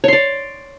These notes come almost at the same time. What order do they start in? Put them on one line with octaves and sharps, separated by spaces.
C#5 C6 D5